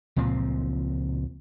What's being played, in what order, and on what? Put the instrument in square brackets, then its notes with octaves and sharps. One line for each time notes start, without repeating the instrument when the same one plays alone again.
[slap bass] C#2 A#2 F3 C4